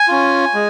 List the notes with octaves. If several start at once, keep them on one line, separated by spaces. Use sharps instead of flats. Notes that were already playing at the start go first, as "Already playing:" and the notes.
Already playing: G#5
C#4 F4
G#3